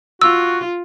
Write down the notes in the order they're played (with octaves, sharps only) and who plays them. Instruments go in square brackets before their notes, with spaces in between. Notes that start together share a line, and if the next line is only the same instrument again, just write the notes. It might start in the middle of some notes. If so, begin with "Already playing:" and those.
[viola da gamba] F4 [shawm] F#4 [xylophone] E6